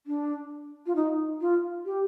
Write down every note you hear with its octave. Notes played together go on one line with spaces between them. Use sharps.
D4
F4
D#4
F4
G4